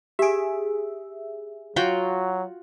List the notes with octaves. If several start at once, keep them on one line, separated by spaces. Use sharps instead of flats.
G4 G#4 E5 D7
F#3 F4 F#4 G5